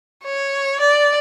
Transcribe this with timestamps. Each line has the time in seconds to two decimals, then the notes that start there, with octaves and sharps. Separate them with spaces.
0.24 C#5
0.81 D5